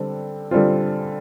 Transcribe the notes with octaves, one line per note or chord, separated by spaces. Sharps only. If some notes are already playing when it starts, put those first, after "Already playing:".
Already playing: D3 G3 C4
D3 G3 C4 F4